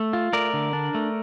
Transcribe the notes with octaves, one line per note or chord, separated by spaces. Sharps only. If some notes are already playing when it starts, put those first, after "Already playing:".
Already playing: A3
F4
A3 A#4 D5
D3
D4
A3